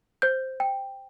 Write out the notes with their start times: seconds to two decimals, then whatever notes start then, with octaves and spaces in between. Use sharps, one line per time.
0.22 C5 G6
0.60 G5